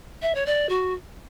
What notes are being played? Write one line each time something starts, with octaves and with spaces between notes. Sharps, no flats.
E5
C#5
D5
F#4